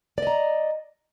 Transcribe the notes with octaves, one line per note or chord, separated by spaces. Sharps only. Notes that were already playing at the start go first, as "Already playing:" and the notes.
D5 D#5 A#5